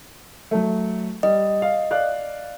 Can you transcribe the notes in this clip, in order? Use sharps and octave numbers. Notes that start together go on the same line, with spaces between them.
F#3 A3
G3 D#5
F5
D5 F5 F#6